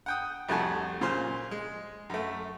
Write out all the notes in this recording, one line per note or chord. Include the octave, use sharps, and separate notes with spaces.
F#5 G5 D#6
C2 F2 A3 F#4 G#5 A5
A#2 C#3 F4 C5 C6
G#3
F#2 A3